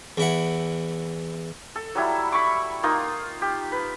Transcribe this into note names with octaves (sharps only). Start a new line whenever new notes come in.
E2 E4 F#5
A4
F#3 G3 E4
B5 C#6 D6
A#3 D#4 F4
G4
B4